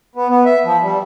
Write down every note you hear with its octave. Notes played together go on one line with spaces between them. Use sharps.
B3
B3
E5
F3
G3